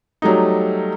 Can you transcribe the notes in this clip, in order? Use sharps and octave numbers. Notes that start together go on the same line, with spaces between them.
F#3 G3 A3 D#4